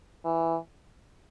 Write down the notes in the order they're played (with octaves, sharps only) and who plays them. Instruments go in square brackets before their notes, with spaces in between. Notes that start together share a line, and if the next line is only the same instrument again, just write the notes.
[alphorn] E3